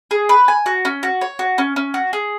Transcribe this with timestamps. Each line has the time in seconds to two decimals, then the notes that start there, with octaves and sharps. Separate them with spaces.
0.11 G#4
0.29 B4
0.48 G#5
0.66 F#4
0.85 C#4
1.03 F#4
1.21 C#5
1.39 F#4
1.58 C#4
1.76 C#4
1.94 F#4
2.13 G#4